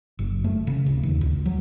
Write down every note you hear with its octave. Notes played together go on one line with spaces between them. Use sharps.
F#1
A3
C#3
D1
D#2
C#2
F#3